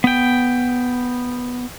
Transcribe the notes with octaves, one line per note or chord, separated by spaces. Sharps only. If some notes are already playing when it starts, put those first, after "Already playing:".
B3 G5